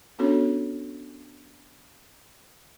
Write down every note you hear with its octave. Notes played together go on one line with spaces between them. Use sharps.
B3 C#4 D4 F#4 A4 C#5